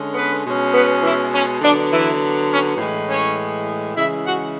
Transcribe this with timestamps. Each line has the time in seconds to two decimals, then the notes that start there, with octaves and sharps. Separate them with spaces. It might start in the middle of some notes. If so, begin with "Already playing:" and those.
Already playing: D3 G#3 C#4
0.14 B3 B4
0.44 B2 G#3 C#4
0.73 B3 B4
1.02 E3 E4
1.32 C#4
1.61 D3 F#3 B3 D4
1.91 E3 E4
2.49 C#4
2.77 A2 E3 G#3
3.07 C#4 C#5
3.94 C#3 E3 G#3 E4 E5
4.24 F#4 F#5